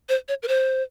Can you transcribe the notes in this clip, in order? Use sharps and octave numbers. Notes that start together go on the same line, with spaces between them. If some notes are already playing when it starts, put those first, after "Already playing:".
C5
C#5
A#4
C5